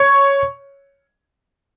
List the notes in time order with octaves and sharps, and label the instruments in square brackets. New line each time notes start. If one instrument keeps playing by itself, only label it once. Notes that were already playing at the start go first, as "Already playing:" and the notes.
Already playing: [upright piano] C#5